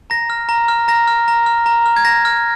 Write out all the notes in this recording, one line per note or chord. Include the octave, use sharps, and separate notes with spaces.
A#5 A#6
F6
A#5
F6
A#5 A#6
F6
A#5
F6
A#5
F6
G#6
A#5 A#6
F6